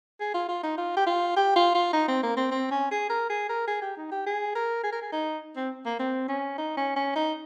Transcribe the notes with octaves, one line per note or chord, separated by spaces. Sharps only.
G#4
F4
F4
D#4
F4
G4
F4
G4
F4
F4
D#4
C4
A#3
C4
C4
C#4
G#4
A#4
G#4
A#4
G#4
G4
D#4
G4
G#4
A#4
G#4
A#4
G#4
D#4
C4
A#3
C4
C#4
D#4
C#4
C#4
D#4